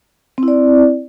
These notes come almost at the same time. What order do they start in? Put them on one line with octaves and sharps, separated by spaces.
C4 E4 D5